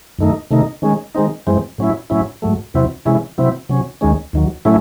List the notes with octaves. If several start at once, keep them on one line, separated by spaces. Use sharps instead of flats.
F#2 D#3 A3 D#4
C3 D#3 A3 D#4
D#3 G#3 C#4
D#3 G#3 C4 D#4
F#2 E3 G#3 C4
A2 F#3 C#4 E4
A2 F#3 C#4 E4
G#2 F#3 A3
E2 C3 F#3 C4 E4
C3 E3 G#3 C#4 E4
C3 F#3 C4 E4
C3 F#3 C#4
D#2 D#3 G#3 C#4
D#2 D#3 F#3
A2 F#3 A3 C#4 E4